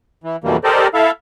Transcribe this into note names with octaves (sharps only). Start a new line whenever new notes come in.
E3
F2 B2 D3 E3 G3 A#3
G4 A4 A#4 C5 D5 D#5
E4 A4 E5 F5